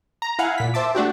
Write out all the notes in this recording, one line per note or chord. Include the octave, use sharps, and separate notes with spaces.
A#5
E4 F5 F#5 G#5
A#2 B6
C5 E5 A5 D6
A3 D4 F#4 G4